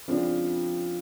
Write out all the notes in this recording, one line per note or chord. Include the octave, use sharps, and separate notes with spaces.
F2 C#3 F3 G#3 D4